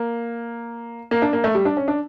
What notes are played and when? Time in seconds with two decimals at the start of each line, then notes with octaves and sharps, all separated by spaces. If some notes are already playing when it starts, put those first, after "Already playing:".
Already playing: A#3
1.11 A#3
1.22 D4
1.33 A#3
1.44 A3
1.55 G3
1.65 D4
1.77 C#4
1.88 D4